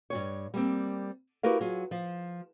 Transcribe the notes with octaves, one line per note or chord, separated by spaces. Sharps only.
G2 C3 C#5
G3 A#3 C4
E4 F#4 G4 A#4 B4 F5
F#3 F4 G#4
F3